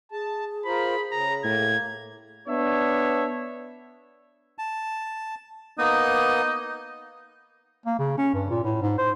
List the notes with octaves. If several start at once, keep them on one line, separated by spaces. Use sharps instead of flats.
G#4 A5
F4 A#4 C5 B5
C#3 A#5
A2 A#3 G#6
B3 D4 C#5 E5
A5
A#3 B3 D#4 D#6
A#3
C#3
C#4
G2
A#2
A2
G#2
C5